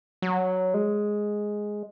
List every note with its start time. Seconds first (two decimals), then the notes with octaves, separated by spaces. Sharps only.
0.22 F#3
0.74 G#3